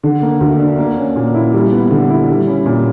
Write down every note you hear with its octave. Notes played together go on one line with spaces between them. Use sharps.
D3
A#3
D2
D4
A#3
C#4
A#2
E4
G3
B3
D3
E4
G3
C#4
A#2